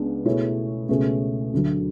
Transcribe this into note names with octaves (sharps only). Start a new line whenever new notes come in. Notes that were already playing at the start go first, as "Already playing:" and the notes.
Already playing: C#2 C#3 G#3 B3 D4
B2 A3 E4 G#4 C#5
C#2 B2 A3 C#4 G#4
D2 D3 F#3